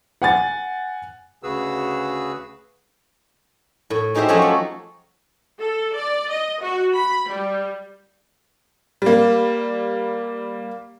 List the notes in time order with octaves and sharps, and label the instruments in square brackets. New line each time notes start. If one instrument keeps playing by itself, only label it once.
[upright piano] F#5 G#5 A6
[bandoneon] D2 C#3 F#4 G#4 B4 E6
[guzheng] A2
G#3 D#4 F#4 G4 C5 E5
F3 F#3 A3 C#4 F#4 G4
A4
[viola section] A4
D5
D#5
F#4
B5
G3
[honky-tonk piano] G3 A#3